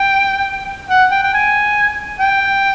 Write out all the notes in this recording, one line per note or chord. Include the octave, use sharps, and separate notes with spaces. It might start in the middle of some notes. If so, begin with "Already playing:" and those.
Already playing: G5
F#5
G5
G5
G#5
G5